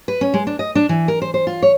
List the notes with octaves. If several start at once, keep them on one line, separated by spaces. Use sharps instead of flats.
B4
C#4
G#3
D4
D#5
D4
E3
A#4
C5
C5
F4
C#5